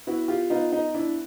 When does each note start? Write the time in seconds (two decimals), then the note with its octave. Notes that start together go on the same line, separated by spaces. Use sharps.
0.07 B3 E4 F#4
0.28 F4 G4
0.50 B3 D#4 F4
0.72 D#4
0.94 D4 E4